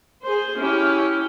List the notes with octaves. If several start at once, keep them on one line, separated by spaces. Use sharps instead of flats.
G#4 C5
C#4 E4 G4